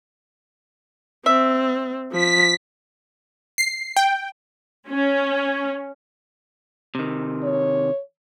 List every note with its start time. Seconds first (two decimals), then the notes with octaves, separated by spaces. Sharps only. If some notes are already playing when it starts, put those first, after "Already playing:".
1.26 C4 E5
2.12 F3 B6
3.58 C7
3.96 G5
4.89 C#4
6.95 C3 D#3
7.43 C#5